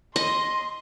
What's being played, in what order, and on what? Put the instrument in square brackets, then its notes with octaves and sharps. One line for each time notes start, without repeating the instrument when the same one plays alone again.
[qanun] D#5 [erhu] C6